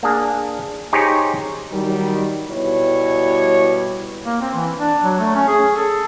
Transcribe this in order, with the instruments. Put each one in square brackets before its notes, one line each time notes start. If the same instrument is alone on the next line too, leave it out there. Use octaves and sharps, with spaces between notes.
[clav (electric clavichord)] A#3 D4 G#4
D#4 G4 G#4 C5 C#5
[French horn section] D#3 F#3 G3
B2 G3 E4 C#5
[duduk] A#3
C4
E3
D4
F#3
A3
C#4
G#4
A4